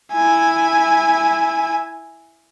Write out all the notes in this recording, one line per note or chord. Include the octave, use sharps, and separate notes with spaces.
E4 G#5